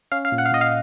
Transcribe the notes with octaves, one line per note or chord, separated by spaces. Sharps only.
C#4 F5
F5
A#2
F#5
F5
A#2 D#5
F5